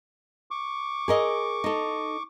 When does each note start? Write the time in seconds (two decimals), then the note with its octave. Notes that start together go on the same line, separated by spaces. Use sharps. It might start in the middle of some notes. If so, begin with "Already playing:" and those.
0.51 C#6 D6
1.08 G#4 A#4 D#5
1.64 D#4 A4